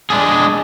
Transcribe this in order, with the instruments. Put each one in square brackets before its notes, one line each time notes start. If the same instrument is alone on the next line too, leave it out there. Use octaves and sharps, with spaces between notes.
[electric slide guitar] G#3 D4 G#4